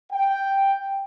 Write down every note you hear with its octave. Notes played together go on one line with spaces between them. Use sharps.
G5